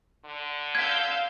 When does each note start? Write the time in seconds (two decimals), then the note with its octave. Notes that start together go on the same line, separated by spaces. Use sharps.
0.25 D3
0.75 F5 E6 G6 G#6 B6